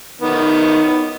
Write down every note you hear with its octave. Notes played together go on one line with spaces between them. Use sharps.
D#3 B3